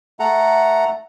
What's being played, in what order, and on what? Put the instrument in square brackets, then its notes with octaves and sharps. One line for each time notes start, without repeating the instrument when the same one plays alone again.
[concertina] A3 A4 F#5 A#5